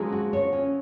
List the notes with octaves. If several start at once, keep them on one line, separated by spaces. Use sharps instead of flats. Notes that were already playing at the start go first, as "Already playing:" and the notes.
Already playing: F3 F#3 G#3
F#4
C#5
C#4